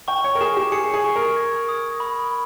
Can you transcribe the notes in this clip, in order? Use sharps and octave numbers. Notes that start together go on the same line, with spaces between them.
G5 C#6
C#5
A#4
G#4 E7
G4
G#4 C#7
G#4
C#6
A#4
G#6
D#6
B5